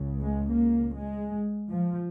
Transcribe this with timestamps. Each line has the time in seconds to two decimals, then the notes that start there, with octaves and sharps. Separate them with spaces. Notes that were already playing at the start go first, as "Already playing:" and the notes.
Already playing: C#2 C#3
0.20 G#3
0.50 A#3
0.95 G#3
1.70 F3